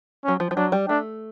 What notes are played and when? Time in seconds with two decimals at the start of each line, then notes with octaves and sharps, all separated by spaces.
0.24 F#3 C#4
0.40 F3
0.51 F3
0.57 F#3 D4
0.72 G3
0.89 A3 D4